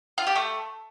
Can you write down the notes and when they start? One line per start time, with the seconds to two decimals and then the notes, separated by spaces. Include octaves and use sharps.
0.18 F4
0.27 G4
0.35 A3